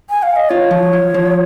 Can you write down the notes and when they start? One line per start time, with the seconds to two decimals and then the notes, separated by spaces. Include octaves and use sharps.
0.10 G#5
0.23 F5
0.36 D#5
0.49 F4 C#5
0.71 F3
0.93 F3
1.14 F3